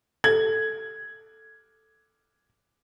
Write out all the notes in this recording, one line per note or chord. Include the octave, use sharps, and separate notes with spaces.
A4 G#6